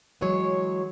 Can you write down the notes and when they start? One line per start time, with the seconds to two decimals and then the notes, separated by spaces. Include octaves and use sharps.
0.21 E3 F#3 G#3 C#5